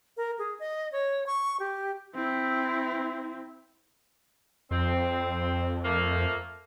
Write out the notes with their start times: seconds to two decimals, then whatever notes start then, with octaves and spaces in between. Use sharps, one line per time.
0.17 A#4
0.39 G#4
0.60 D#5
0.92 C#5
1.27 C#6
1.60 G4
2.15 C4 E4
4.71 F2 C4
5.84 F3 A3 A#3